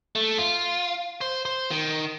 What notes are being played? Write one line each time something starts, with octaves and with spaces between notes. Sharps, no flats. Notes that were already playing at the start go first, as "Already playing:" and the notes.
A3
F4
C5
C5
D#3